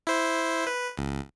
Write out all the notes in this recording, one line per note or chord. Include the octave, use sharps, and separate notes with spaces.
E4 C5
B4
C#2